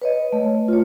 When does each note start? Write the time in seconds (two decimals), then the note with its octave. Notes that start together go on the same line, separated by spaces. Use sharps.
0.02 B4 C#5 D#5
0.33 A3
0.68 F4 C#5